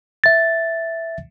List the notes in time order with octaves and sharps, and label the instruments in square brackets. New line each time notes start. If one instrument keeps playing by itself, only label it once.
[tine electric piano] E5 A6